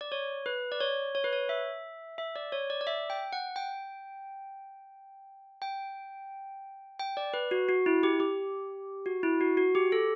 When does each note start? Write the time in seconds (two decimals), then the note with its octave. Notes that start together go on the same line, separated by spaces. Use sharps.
0.01 D5
0.12 C#5
0.46 B4
0.72 D5
0.81 C#5
1.15 C#5
1.24 B4
1.33 C#5
1.49 E5
2.18 E5
2.36 D5
2.52 C#5
2.70 D5
2.81 D5
2.87 E5
3.10 G5
3.33 F#5
3.56 G5
5.62 G5
6.99 G5
7.17 D5
7.34 B4
7.51 F#4
7.69 F#4
7.86 E4
8.03 G4
8.20 G4
9.06 F#4
9.23 E4
9.41 F#4
9.57 F#4
9.75 G4
9.92 A4